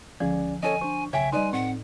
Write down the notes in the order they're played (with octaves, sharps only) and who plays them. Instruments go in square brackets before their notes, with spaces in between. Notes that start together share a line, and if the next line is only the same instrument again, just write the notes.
[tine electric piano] C#2 C#4 D5 [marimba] D3 F3 [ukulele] G#4
[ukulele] C#4 A4 C#5 [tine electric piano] D#5 [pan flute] G#5
[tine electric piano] D4 C#6 [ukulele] C5
[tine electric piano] B1 C#3 [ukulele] C#5 G5 G#5 [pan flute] E5
[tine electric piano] G3 C6 [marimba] D#4 D5 D#5 [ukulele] B4 [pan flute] G#5
[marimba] A2 [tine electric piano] C4 [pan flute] F#5